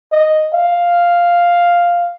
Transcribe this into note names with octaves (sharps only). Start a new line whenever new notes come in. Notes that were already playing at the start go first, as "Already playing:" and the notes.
D#5
F5